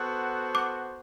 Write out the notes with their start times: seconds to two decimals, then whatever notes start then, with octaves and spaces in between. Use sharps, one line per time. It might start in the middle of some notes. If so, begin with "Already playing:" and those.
Already playing: B3 F#4 A4 C5 F#5
0.55 D6